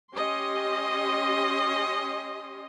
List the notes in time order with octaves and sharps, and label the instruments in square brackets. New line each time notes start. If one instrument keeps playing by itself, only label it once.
[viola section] C#4 G4 D#5 C6